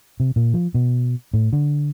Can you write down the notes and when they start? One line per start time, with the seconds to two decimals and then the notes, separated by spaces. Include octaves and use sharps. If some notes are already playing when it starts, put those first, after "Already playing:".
0.20 C3
0.36 A#2
0.54 F3
0.74 B2
1.34 A2
1.53 D3